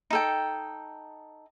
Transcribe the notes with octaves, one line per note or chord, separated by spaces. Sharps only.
D#4 A4 G5